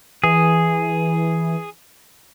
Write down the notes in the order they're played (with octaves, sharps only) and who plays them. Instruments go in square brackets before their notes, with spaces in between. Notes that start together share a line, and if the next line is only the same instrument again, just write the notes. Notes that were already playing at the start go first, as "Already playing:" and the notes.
[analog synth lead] E3 [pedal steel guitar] G#4